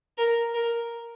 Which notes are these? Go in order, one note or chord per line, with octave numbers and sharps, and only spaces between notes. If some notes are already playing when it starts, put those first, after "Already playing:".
A#4
A#4